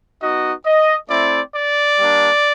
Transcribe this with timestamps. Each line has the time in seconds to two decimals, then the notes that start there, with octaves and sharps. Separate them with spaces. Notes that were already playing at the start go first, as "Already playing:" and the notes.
0.22 B3 D#4 F#4 D#5
0.66 D#5
1.10 A3 C4 E4 D5
1.54 D5
1.98 G3 A#3 D4